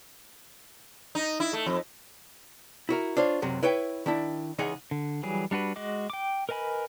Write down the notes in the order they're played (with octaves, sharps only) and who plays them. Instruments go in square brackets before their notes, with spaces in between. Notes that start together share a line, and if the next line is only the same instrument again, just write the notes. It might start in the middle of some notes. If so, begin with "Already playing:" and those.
[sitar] D#4
E4
A3
F2
[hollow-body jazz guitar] E4 F#4 A#4
D4 F4 C5 C#5
C#2 F#2 C3 F#3
E4 B4 C#5 G5
D#3 D4 E4
C#2 E3 D#4 G#4 F#5 G#5
[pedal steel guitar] D3
E3 F#3 G3 G#4
G3 D4 F#4 B4
G#3 F#4 D#5 D6
G5 D6
A#4 B4 D#5 G#5 B5